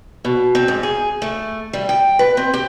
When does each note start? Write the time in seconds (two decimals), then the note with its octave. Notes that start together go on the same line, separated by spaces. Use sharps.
0.25 B2
0.55 C4
0.68 G#2
0.83 G#4
1.22 A3
1.73 G3
1.89 G5
2.19 B4
2.37 C4
2.54 G4